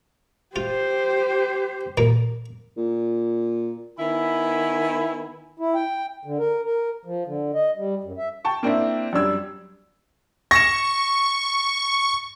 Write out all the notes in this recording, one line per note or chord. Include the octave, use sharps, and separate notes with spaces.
F4 G4 C5
A#2 A#3
A#2
D#3 B3 E4 G#5 B5
E4
G5
D3
A#4
A#4
F3
D3
D#5
G3
F#2
E5
G5 A5 C#6
A#3 C4 D4 E4
F#2 G3 D4 E6 G#6
C#6 A#6 E7